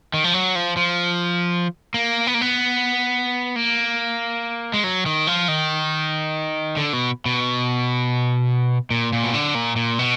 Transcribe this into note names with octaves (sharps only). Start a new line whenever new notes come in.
D#3
F3
F#3
F3
F3
A#3
B3
A#3
B3
A#3
G#3
F#3
D#3
F3
D#3
D3
B2
B2
A#2
A#2
B2
D3
A#2
A#2
B2